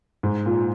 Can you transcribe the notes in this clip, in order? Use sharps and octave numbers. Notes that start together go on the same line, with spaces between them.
G#2
A#2